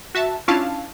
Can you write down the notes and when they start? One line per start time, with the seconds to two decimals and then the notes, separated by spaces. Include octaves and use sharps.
0.15 F#4 E5 A5
0.48 C#4 D4 E4 F4 F5 A5